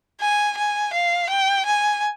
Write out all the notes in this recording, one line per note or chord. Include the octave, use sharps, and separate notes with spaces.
G#5
G#5
F5
G5
G#5